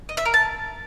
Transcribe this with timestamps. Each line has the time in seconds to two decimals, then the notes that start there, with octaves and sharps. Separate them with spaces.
0.09 D#5
0.17 E5
0.25 A#4
0.34 A5